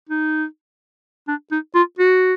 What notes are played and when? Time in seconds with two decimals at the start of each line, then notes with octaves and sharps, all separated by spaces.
0.09 D#4
1.28 D4
1.52 D#4
1.75 F4
1.99 F#4